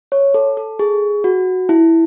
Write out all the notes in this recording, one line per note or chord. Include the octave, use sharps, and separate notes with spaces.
C#5
A4
A4
G#4
F#4
E4